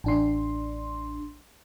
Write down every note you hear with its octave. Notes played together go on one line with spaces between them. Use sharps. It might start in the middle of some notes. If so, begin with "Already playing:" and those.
A1 D4 C6